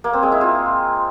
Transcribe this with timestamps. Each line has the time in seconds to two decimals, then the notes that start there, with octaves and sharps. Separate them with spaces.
0.04 A#3
0.13 C4
0.23 G#3
0.32 E4
0.41 F4